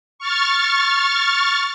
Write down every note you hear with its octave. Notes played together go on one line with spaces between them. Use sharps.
C#6 F6 A6